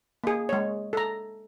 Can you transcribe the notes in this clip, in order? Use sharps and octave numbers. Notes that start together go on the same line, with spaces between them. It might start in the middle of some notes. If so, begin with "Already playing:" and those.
A#3 G#4
G#3 C#5
A4 A#5